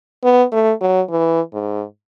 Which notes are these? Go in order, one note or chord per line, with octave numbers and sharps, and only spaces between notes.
B3
A3
F#3
E3
G#2